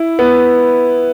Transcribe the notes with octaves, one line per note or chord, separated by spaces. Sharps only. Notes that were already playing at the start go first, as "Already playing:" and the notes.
Already playing: E4
B3